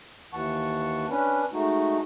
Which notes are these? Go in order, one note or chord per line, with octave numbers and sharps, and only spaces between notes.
D#2 E3 F#5 A5 C#6
C#4 D4 B4
G#3 A3 D#4 F#4